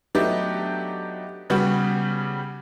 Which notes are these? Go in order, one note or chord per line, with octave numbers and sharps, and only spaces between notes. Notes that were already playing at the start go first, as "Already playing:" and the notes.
F#3 A3 B3 D4 D#4 G4
C#3 G3 B3 F#4 G4